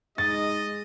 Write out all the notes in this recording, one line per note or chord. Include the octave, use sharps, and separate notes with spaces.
G#3 D#4 D#5 A6